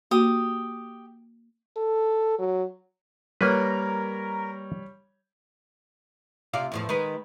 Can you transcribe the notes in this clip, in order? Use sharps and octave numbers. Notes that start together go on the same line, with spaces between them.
A#3 F#4 G4 D#6
A4
F#3
G3 A#3 A#4 B4 C#5
C3 F4 D5
E2 A2 F3
D#3 G#3 B4